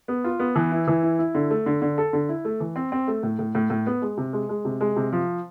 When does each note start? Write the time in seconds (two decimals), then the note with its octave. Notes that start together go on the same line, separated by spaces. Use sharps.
0.08 B3
0.24 F4
0.40 B3
0.56 E3
0.71 E4
0.88 E3
1.03 E4
1.19 E4
1.35 D3
1.50 A3
1.66 D3
1.82 D3
1.98 A4
2.13 D3
2.29 E4
2.45 A3
2.60 E3
2.76 C4
2.92 C4
3.08 A3
3.23 A2
3.39 A2
3.55 A2
3.70 A2
3.86 B3
4.02 G#3
4.17 C3
4.33 G#3
4.49 G#3
4.65 C3
4.81 G#3
4.96 C3
5.12 F3